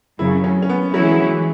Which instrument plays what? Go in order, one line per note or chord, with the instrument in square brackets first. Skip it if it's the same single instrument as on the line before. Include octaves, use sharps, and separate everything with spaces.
[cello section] F#2 C#3 F#3 [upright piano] E4
[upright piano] C#4
C#4
B3
[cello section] E3 C#4 E4 [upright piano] F#3
[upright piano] G#3
F#3
E3